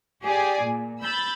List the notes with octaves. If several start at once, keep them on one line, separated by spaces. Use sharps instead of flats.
G4 G#4 D5 G#5
A#2
B5 E6 G6 A6